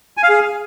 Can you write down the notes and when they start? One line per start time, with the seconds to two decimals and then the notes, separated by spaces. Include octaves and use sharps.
0.17 G#5
0.23 F5
0.29 G#4